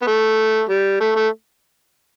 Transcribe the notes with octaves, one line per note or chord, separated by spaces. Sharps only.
B3
A3
G3
A3
A3